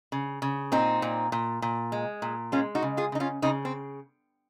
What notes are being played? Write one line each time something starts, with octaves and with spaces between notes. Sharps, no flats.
C#3
C#3
A#2 C4 D#4
A#2
A#2
A#2
G#3
A#2
G#3 C#4 F4
D#4 F#4
C#3
F4 G#4
C#3 D#4
C#4 F4
C#3 C4 D#4
C4